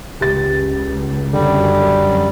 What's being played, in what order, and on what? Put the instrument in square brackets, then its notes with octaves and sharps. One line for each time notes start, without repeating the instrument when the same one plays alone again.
[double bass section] C#2 [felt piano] G4 A6
[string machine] F#2 [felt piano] D3 [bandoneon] G3